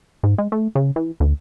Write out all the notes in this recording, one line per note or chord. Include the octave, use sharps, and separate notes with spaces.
G#2
G#3
A3
C#3
E3
D2